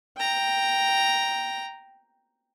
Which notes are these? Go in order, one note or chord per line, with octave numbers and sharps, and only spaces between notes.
G5 A#5